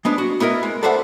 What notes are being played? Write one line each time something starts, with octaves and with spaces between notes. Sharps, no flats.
G#3 B3 D4
F#4
B3 E4 A#4 D#5
G#3
A4 B4 C5 D5 E5 F#5